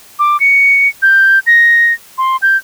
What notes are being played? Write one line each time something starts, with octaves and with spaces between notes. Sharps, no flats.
D6
C#7
G6
A#6
C6
G6